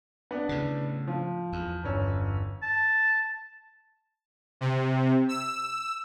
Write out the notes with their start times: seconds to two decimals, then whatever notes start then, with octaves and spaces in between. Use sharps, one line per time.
0.31 B3 D4
0.49 A2 C#3
1.08 F3
1.53 E2
1.84 G1 C#4 E6
2.63 A5
4.61 C3
5.29 E6